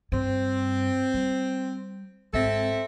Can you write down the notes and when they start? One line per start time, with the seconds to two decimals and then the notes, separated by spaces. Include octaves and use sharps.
0.12 G2 C4
1.14 G3
2.33 G#1 C4 A4 E5